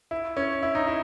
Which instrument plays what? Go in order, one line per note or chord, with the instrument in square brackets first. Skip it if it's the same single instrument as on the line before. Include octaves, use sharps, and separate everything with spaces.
[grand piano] E4
C#4
E4
D#4
E4